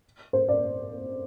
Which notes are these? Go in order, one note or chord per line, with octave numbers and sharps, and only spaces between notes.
C5
D5